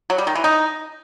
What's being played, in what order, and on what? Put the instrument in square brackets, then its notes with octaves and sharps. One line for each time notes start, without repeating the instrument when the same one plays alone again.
[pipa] F#3
G3
D#3
E3
D#4